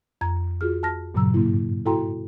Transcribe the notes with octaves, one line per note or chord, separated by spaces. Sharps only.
F2 A#5 G#6
F4 F#4 G#4 F6
A5 F6 A#6
G2 A#2 C#3 F#3 A#5 E6
G#2 A#3 E4
E4 F#4 A4 G5 A#5 C6